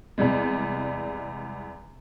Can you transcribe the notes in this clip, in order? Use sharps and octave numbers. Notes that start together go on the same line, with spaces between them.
E2 C3 G3 G#3